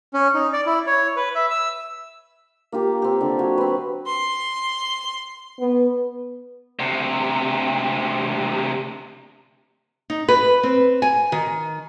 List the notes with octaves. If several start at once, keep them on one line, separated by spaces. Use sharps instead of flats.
C#4
D#4
D5
E4
C#5
B4
E5
E6
A#3 F4 G4 A#4
C4 G4
D3
F#3 C#5
C4 B4
C6
B3
D2 C3
D#4
B4
C4
G#5
D#3